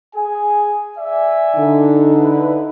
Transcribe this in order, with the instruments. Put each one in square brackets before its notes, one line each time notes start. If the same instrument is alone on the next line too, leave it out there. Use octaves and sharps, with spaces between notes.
[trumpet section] G#4 G#5
D5 E5 G#5
[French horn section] D3 D#4
[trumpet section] E4 B4